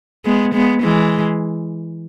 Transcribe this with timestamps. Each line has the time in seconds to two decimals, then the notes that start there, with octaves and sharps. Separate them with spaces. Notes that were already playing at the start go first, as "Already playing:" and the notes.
0.25 G#3 B3
0.54 G#3 B3
0.82 E3 G#3